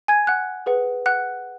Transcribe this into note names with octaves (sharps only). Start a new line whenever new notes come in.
G#5 G#6
F#5 F#6
G#4 B4 F#5
F#5 F#6